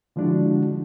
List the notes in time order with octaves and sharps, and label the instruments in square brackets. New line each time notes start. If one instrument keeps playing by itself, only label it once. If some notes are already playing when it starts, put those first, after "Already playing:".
[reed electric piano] D3 F3 G#3 D4 E4 F#4